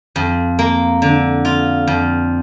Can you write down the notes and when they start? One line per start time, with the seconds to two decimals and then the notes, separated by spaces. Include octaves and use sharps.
0.16 F2
0.59 A#3
1.02 D3
1.45 F4
1.87 F2